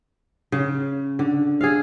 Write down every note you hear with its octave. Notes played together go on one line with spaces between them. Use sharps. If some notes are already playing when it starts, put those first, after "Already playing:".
C#3
D3
G#4 A4 F5